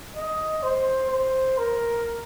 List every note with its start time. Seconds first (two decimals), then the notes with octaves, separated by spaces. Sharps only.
0.16 D#5
0.63 C5
1.10 C5
1.58 A#4